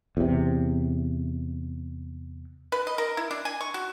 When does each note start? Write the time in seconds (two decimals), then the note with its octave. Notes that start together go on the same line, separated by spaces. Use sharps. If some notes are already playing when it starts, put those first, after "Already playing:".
0.17 E2 C3
2.72 B4
2.87 D#5
2.98 A#4
3.17 E4
3.31 D4
3.45 G#5
3.61 C#6
3.74 F#4